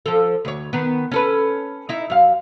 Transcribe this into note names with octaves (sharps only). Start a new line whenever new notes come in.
F3 A4
D2 C#5
D#3 B3
C#4 A4 B4
D#4 E4
F#2 F5